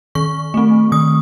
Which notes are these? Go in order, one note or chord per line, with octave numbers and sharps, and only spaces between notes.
D#3 C#6
A3 C4
D#3 D#6